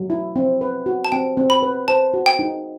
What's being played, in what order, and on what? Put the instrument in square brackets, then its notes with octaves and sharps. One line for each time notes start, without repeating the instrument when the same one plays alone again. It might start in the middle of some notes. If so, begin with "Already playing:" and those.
Already playing: [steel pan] F#3
E4
C4
B4
F#4
[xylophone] A5
[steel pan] C4 [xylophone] G5
[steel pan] C4
[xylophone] B5
[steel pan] B4
[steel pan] C5 [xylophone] A5
[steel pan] F#4
[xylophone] G5
[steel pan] D#4